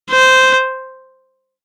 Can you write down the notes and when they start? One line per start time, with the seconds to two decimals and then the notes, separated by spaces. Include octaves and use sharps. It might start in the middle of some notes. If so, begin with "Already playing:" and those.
0.10 C5